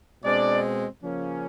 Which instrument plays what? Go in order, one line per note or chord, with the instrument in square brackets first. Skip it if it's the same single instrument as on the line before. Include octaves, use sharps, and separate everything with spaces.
[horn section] B2 G#3 C4 D4 D5
C#3 F3 A#3 C#4